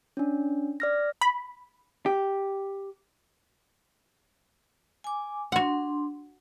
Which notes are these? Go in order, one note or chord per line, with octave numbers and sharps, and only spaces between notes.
C#4 D4
D5 F6 A#6
B5
G4
G#5 D6
D4 F#4 F#5 C6